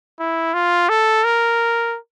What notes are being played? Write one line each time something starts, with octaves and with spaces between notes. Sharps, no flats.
E4
F4
A4
A#4